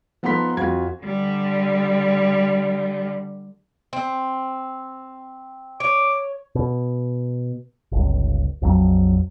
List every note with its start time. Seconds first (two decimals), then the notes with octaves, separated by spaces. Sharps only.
0.23 F3 B3 D#4 A4 C6 B6
0.57 F2 F4 F#4 G#6
1.03 D3 G3
3.93 C4
5.80 C#5 D6
6.55 B2
7.92 G1 C#2
8.62 A#1 F2 F#3